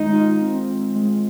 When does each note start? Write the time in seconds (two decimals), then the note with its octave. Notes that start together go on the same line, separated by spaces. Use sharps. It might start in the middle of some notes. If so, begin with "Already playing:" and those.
Already playing: D#3 G#3 D#4
0.13 F4
0.41 C4
0.68 C4
0.95 G#3